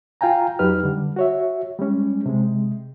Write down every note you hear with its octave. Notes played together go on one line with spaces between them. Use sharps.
F4 F5 G5 G#5 A#5
F2 F#3 D#4 G4 B4 F6
D3 G3
F#4 C#5 E5
G3 G#3 C#4
C3 G#3